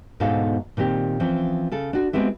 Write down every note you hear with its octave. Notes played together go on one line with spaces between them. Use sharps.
D2 G#2 B2 D#4 A4 F5
A#2 D#3 C4 G4
E3 F3 C4 C#4
C#3 A4
D4 F#4
G#3 B3 C4 E4 G4